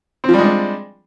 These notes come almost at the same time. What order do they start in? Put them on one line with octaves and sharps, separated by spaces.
C4 F3 G3 G#3 D4